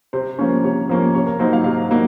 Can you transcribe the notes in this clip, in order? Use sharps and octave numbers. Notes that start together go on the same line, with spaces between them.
C3 C5
F3 A#3 C#4
C3 C#5
F3 A#3 C#4
C3 C#5
A#4
F#3 A#3 D#4 C5
F5
C3 F5
F#3 A#3 D#4